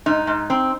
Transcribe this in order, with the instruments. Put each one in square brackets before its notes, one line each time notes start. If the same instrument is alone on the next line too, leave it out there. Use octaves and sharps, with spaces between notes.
[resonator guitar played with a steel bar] G#2 D#4
G#2
C4